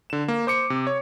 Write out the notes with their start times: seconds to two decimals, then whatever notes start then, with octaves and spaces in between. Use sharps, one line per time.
0.10 D3 E7
0.28 A#3
0.47 C5 D6 C#7
0.70 C3
0.87 C#5